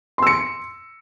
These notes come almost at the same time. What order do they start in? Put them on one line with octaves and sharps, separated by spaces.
C6 E6 C#7